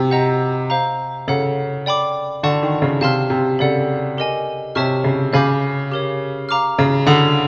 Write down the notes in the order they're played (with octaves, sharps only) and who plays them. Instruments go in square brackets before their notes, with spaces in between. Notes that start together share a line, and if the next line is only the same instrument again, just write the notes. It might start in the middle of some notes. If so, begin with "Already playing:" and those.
Already playing: [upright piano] C3
[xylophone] C5 D#5 F#5 A#5
C5 F5 A#5
[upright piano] C#3 [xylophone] A4 C#5 F#5
[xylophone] D5 G5 B5 D6
[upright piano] D3 [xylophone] D5 F#5 A5 C#6
[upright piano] D#3
C#3
[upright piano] C3 [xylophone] F5 A5 C6 F6
[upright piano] C3
[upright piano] C#3 [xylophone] A4 D5 F#5
[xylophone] G4 A#4 D#5 G#5
[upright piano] C3 [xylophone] C#5 E5 A5 C#6 F6
[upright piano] C#3
[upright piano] C#3 [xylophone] F5 G#5 B5 D6 G6
[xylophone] G4 A#4 C#5
F5 A#5 D6 F6
[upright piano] C#3
[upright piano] D3 [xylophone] F#5 B5 D#6